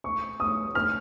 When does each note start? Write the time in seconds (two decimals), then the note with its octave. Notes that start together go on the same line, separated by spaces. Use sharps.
0.04 C#6
0.40 D#6
0.75 F6